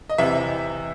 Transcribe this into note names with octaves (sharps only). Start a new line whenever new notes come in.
D#5
E2 C3 E3 E5